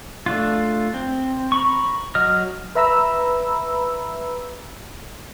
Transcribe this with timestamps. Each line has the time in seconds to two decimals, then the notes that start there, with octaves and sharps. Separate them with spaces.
0.26 A3 D4 F4
0.94 C4
1.52 A#5 B5 C#6
2.15 F#3 D#5 F6
2.75 B4 E5 A#5 B5 E6